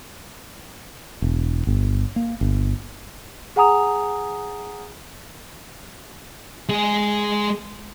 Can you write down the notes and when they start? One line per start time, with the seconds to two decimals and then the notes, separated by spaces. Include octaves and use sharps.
1.22 E1
1.67 G1
2.16 A#3
2.41 G1
3.56 G#4 F#5 G#5 A#5 D#6 F7
6.69 G#3 G#4